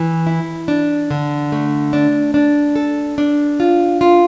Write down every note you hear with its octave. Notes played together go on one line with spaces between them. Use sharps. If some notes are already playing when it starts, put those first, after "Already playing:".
Already playing: E3
E4
D4
D3
A3
D4
D4
A4
D4
F4
F4